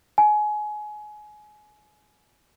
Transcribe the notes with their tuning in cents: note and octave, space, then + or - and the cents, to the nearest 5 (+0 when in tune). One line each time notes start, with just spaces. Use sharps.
G#5 +25